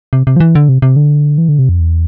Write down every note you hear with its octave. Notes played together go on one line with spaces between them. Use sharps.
C3
C3
F3
E3
D3
C3
C3
D3
E3
D3
C3
F2
E2